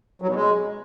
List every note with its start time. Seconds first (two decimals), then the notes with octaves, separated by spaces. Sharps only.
0.22 F#3
0.28 B2
0.35 G#3